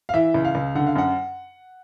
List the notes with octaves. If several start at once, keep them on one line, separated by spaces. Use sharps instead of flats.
F5
E3 E5
C#2
F5
C#2
D3 F#5
F5
F#2 F#5